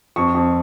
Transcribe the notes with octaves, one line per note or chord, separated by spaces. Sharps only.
F2 C#6
F2